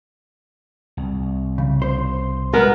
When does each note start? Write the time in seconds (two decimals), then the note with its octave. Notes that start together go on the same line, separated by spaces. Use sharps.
0.97 C2
1.58 C#3
1.82 C5
2.53 G#3 B3 A#4